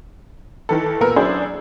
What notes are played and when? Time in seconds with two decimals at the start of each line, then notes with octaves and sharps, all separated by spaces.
0.69 D#3 E3 A4
1.00 A#2 B3 A#4 E6
1.16 F#3 C#4 D4 E4 G#4 C5